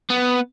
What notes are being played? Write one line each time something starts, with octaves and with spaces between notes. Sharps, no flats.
B3